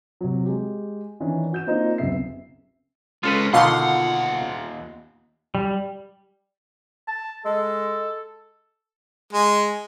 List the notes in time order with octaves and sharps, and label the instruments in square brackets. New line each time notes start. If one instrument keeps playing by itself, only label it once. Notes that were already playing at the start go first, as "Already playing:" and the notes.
[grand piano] C3 F#3
G#3 G4
D#3 E3 C#4 D4
F#4 G6 E7
A#3 C4 D4 D#4 F4
F#1 C#2 C3 B3 E5 C7
[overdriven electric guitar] G#3 C#4 [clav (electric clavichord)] F4 A4 B4
[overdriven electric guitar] D#2 F#5 [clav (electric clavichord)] B2 D3 D#3 [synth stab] F4 C6
[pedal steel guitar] G3
[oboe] A5
[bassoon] G#3 [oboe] A4
[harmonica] G#3